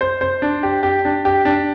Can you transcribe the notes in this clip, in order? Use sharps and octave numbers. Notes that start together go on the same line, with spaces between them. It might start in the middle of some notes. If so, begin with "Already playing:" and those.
C5
C5
D4
G4
G4
D4
G4
D4